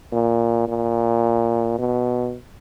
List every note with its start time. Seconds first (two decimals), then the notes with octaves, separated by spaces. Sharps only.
0.12 A#2
0.68 A#2
1.79 B2